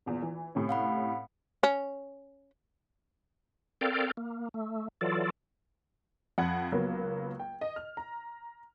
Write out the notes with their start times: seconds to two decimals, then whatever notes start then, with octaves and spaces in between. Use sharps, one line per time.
0.06 A#1 E2
0.22 E3
0.55 A2 C3 C#4
0.69 F5 F#5 B5
1.63 C#4
3.81 C4 A4 A#4 D5 F5 G5
4.17 A#3
4.54 A3
5.01 E3 F#3 F4 A4 D5
6.38 F2 F#5 B5 G#6
6.72 C#2 F#3 A#3 B3
7.40 G5
7.61 D#5
7.76 F6
7.97 A#5